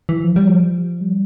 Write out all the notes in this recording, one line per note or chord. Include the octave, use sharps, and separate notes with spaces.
E3
F3
G3
F3
G3